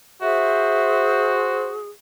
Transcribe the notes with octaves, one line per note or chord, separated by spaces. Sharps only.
F#4 G#4 C5 E5